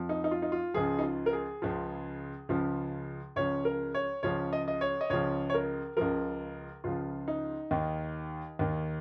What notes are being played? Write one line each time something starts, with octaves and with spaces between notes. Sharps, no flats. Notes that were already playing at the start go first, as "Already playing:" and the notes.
Already playing: F2 F3
D#4
D#4
F4
D#4
F4
C#2 C#3 F3 G#4
D#4
F4
A#4
G#4
C#2 C#3 F3
C#2 C#3 F3
C#2 C#3 F3 C#5
A#4
C#5
C#2 C#3 F3 C#5
D#5
D#5
C#5
D#5
C#2 C#3 F3 C#5
C#5
A#4
C#2 C#3 F3 A#4
C#2 C#3 F3 F4
D#4
D#2 D#3
D#2 D#3